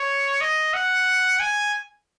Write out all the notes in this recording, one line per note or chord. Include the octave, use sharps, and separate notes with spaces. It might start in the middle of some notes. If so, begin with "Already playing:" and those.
Already playing: C#5
D#5
F#5
G#5